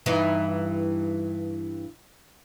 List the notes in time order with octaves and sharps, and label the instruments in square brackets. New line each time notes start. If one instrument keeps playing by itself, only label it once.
[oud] G2 E3 D#4